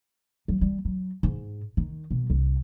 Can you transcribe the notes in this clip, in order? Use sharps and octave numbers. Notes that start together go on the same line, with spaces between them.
F#3
G3
F#3
G#2
D#3
B2
C2